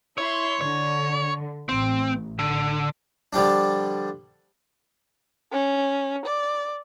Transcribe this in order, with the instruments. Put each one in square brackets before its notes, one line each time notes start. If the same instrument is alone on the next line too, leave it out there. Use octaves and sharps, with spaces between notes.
[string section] E4 C6 [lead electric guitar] C#5
[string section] D3 [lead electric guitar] C#5
[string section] A1 [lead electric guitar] C4
[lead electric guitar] D3
[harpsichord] D3 F3 G3 D4
[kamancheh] C#4
D5